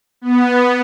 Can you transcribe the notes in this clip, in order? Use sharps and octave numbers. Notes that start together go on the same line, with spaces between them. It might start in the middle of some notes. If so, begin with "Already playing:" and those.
B3